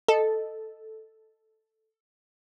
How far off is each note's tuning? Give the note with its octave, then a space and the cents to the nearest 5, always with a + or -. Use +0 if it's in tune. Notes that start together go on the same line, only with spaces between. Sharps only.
A4 +0 D#5 +0